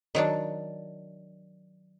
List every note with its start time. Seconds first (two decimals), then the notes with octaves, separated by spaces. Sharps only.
0.15 D#3 F#3 D4